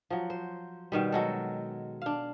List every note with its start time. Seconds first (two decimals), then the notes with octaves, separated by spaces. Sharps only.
0.10 F3 F#3
0.30 C5
0.92 B2 D#3 G3
1.12 F#3 G#3 A4
2.02 D4 F5